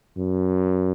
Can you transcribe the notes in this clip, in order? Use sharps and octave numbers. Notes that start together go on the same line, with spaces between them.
F#2